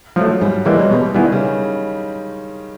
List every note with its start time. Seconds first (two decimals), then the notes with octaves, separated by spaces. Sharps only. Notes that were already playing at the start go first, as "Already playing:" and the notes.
0.16 F3 F#3
0.21 A3
0.41 G#2 G3
0.65 E3 G3 G#3 A#3
0.79 F#3
0.91 B2 G3
1.14 D#3 G3 B3 E4 G#4
1.32 C#3